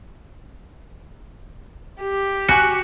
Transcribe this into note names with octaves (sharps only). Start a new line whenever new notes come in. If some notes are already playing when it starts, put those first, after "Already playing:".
G4
F#4 G#5 F#6 C#7